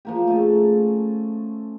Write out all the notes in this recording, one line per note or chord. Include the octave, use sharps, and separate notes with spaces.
F3 A#3 G4
A3 C#4 G#4 A4